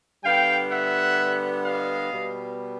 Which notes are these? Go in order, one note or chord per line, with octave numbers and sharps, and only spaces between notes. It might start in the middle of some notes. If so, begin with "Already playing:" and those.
D3 G3 B3 F5 G5
E5 F#5
D#5 F5
B2 G3 B3